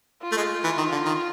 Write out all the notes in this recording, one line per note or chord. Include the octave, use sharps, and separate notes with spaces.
F4
A3
G#3
E3
D#3
D3
D#3